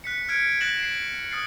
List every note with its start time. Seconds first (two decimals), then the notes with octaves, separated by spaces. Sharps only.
0.04 F#6 B6 C#7
0.29 F6 G#6 B6 C#7 D7
0.61 F#6 A6 A#6 E7 F#7
0.79 C7 D7
1.31 D#6 F6 A6 C7